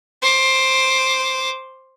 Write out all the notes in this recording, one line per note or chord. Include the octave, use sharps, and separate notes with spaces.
C5 D6